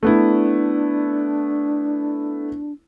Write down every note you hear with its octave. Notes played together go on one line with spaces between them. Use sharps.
A3 B3 D4 E4